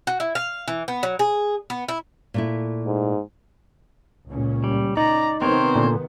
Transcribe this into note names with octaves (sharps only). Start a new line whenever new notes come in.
F#4
E4
F5
E3
B3
F#3
G#4
B3
E4
A#2 A3 E4
G#2
C#2 A#2 C#4
G3
D#4 D5 A#5
C3 D#3 B3 C4 A#4 C5 C#5
A#2 D3